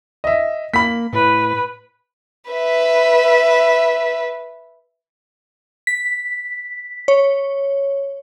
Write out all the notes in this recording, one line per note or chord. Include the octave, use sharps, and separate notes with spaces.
D#5 E5
A#3 B5 B6
A2 B4
B4 E5
B6
C#5